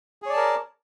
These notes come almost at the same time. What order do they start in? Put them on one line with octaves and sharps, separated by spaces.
G#4 C#5 D5 A5 A#4